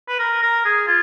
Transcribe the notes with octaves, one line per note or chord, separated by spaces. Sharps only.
B4
A#4
A#4
G#4
F4